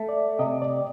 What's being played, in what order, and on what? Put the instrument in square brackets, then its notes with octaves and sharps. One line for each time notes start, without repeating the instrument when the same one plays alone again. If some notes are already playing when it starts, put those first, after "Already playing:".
Already playing: [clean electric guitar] A3
[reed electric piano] D5
[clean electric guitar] C3 [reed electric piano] D#5
[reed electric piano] D5